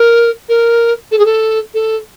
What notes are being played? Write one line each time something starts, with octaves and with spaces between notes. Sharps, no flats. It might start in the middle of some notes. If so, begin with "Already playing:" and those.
Already playing: A#4
A#4
A4
G#4
A4
A4